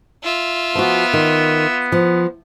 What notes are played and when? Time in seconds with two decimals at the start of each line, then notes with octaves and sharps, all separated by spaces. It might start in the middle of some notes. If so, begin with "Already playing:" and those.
0.24 F4 E5
0.75 F3 B3 F#4
1.13 D#3
1.92 F3